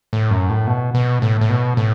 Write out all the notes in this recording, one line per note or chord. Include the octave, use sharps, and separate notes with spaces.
A2
F#2
A2
B2
B2
A2
A2
B2
A2